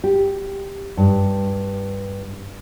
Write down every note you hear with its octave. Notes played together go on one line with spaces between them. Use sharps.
G4
G2